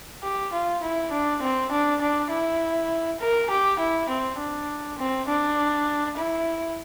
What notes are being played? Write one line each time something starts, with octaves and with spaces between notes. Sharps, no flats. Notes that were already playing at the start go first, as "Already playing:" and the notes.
G4
F4
E4
D4
C4
D4
D4
E4
A#4
G4
E4
C4
D4
C4
D4
E4